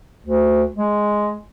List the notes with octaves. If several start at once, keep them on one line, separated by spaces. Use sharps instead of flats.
D2
G#3